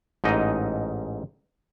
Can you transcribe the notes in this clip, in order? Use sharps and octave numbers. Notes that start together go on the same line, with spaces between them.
A1 G#2 D#4 D#5